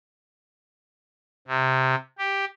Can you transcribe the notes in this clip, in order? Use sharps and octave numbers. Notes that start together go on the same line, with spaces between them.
C3
G4